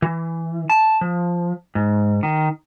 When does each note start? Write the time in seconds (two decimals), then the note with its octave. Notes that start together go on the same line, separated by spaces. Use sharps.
0.02 E3
0.70 A5
1.01 F3
1.75 G#2
2.23 D#3